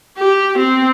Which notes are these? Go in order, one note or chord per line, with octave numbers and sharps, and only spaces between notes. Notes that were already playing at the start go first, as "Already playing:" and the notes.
G4
C4